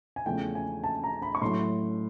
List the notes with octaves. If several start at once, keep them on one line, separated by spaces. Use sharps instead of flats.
G#5
E2 C#3 F3 A3 G5
G#5
A5
A#5
B5
C#6
A2 F#3 A3 C6